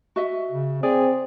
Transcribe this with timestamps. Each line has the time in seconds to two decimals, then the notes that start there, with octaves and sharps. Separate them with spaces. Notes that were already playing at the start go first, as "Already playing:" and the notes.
0.16 F#4 D#5 E5
0.50 C#3
0.83 C4 G#4 D5